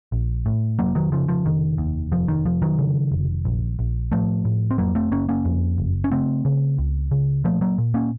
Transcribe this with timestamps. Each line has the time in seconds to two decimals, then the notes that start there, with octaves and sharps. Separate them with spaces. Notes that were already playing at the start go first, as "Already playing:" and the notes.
0.12 A#1
0.46 A2
0.79 F1 F#3 A#3
0.95 D#3 F#3
1.12 C#3 F3
1.28 F3
1.45 F1 D#3
1.78 D#2
2.12 F1 F3
2.28 D#3
2.45 F1 F3
2.62 D#3 F#3
2.79 C#3
3.12 F1
3.45 A#1
3.79 A#1
4.12 A2 F3 A3
4.45 A2
4.70 C4
4.78 F2 F#3 A#3
4.95 A3 C4
5.11 F#1 A#3 C#4
5.29 A#3 C#4
5.45 F2
5.78 F#1
6.04 C#4
6.11 C#3 A3 C4
6.45 C#3
6.78 C#2
7.11 C#3
7.44 A#2 F3 A3
7.61 F#3 A#3
7.78 A#2
7.94 A#3 C#4